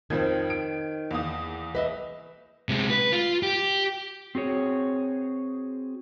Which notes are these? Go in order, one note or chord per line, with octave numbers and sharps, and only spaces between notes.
F2 D#3 F3 C4 G#6
D7
E2 A#3 D#6
B4 D#5 E5
C3 G#3
B4
F4
G4
C4 F#4 G#4 C#5